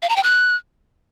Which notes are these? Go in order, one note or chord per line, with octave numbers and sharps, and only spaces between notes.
F5
A#5
G5
F#6